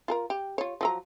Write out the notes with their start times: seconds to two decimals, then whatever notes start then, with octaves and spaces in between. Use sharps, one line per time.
0.08 F4 A4 A#4
0.30 G4
0.58 F4 C#5
0.81 F3 F#3 A#5